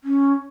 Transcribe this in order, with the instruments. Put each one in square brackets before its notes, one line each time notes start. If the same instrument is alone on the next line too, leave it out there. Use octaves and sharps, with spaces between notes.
[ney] C#4